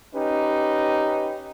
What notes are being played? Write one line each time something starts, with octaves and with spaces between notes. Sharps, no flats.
C#4 D#4 G4 B4